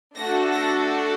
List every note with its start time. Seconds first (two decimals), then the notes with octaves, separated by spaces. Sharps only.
0.15 A3 D4 F#4 A4 A#6
0.52 A#6